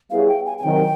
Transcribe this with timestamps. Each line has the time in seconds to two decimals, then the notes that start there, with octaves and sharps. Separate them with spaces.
0.10 G3 B3 E4 G#4 C#5 F5
0.28 G5
0.46 G#5
0.58 G#5
0.63 C3 D#3 F#3 G5